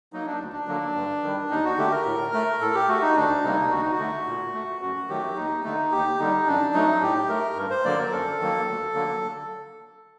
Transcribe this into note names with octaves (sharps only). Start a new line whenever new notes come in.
F#3 A#3 D#4
D4
D2
D4
D3 F#3 A#3
G2
D#3 G3
D#2 D#4
F#4
D3 A3 G4
A#4
A2
A3
A2 A4
G4
A3 F#4
D#4
D2 D4
C3 G3 A#3 D#4
D2 F#4
D#4
F#4
D3 A3
A#2
A3
F#2 F#4
D#3 F#3 A3 G4
D#2 D#4
D3 A3 D#4
D#2 G4
D3 G3 D#4
F#2 D4
F#3 A3 D#4
A2 G4
A3 A#4
G2
C5
D3 F#3 A#3 D5
A#4
F#2 A4
D#3 F#3 A#3
D2
D3 F#3 A#3